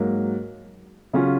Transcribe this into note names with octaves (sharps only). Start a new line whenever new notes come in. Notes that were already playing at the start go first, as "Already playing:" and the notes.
Already playing: G#2 F#3 A#3
C#3 F#3 C#4 F4